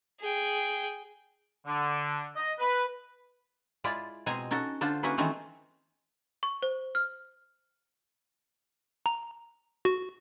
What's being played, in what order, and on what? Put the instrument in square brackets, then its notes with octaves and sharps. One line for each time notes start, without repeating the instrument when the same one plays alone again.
[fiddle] G#4 G5
[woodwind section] D3
D#5
B4
[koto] G#3 E4 F4 D5
B2 G#3 C4 G#4 G#5 A#5
C#4 D#4 F#4 A4
D3 D4 F4 C5
A#3 C#4 E4 F#4 G#4 B4
D#3 E3 G#3 A3 C4 C#4
[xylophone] C#6
C5
F6
[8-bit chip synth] A#5
F#4